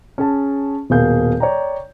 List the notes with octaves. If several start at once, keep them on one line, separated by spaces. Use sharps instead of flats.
C#4 G#4 A5
D#1 B2 A#3 G#4 F5 G6
C#5 D5 G5 A#5